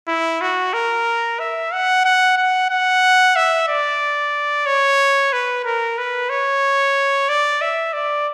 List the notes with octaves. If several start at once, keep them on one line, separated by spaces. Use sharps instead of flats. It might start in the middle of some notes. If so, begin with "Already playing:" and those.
E4
F#4
A#4
E5
F#5
F#5
F#5
F#5
E5
D5
C#5
B4
A#4
B4
C#5
D5
E5
D5